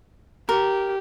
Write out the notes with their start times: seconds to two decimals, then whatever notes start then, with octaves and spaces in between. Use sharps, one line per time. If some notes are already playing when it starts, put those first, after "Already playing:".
0.49 G4 A#4